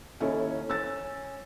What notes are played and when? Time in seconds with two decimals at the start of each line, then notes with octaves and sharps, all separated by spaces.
0.20 D#2 C#4 E4 A4
0.69 C#4 E6 A6